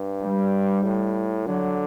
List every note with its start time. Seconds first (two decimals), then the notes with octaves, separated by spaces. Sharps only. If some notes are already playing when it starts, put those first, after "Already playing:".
Already playing: G2
0.22 G3
0.84 A2
1.46 D3 F#3